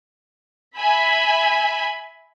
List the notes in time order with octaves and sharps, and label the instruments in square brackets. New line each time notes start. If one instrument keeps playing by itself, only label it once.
[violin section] E5 G#5 B5